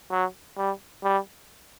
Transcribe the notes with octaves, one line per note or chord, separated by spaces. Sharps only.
F#3
G3
G3